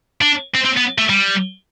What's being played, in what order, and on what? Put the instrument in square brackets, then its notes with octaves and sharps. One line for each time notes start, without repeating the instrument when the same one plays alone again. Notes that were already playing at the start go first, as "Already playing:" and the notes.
[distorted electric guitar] D4
C4
C4
B3
A3
G3